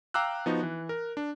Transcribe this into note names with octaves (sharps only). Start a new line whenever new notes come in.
F5 G5 A#5 D6 E6 F#6
F3 B3 D#4 F#4
E3
A#4
D4